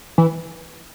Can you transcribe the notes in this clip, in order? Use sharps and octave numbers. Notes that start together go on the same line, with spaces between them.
E3